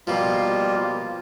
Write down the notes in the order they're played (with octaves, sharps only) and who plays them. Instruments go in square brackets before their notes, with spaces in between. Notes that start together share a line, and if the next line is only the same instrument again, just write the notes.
[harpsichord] B2 F3 [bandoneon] G3 A#3 F4